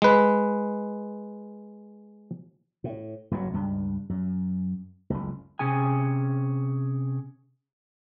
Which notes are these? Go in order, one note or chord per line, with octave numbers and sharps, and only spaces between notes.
G#3 B4
A2
F#1 G2 C#3 F#3
C#2 G2
F#2
F#1 C#2
C3 C#4 G#4 G#5